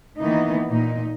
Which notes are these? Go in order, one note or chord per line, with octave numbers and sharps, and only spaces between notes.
D#3 E3 A#3 B3 D#4
A#2 D#4